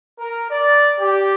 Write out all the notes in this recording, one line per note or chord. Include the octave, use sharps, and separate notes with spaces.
A#4
D5
G4